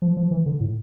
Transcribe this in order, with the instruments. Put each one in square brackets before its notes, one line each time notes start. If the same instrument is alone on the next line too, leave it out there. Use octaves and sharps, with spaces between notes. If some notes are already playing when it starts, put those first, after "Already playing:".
[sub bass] F3
F3
E3
D3
A2